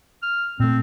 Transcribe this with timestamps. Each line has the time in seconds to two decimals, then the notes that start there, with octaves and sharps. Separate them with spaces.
0.22 F6
0.60 A#2 A3 C4